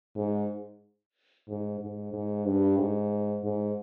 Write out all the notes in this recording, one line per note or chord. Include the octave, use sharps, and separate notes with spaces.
G#2
G#2
G#2
G#2
G2
G#2
G#2